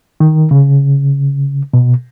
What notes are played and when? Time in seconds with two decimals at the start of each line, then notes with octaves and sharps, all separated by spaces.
0.20 D#3
0.51 C#3
1.74 B2